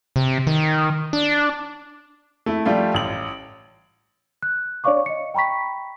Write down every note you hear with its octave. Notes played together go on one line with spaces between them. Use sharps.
C3
D#3
D4
A3 E4
F3 G3 A3 F4
A1 F#7
F#6
D4 C#5 D5 F5 C#6 D6
D#5 C#7
G5 A#5 B5 C#6 B6